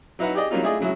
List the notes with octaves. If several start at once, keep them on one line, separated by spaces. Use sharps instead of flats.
F#3 D#4 E4 B4 E5 F#5
G4 G#4 D5 D#5
F#3 G3 A#3 C#4 D#4 F4
A3 E4 F4 G#4 D5 D#5
C#3 F#3 G#3 E4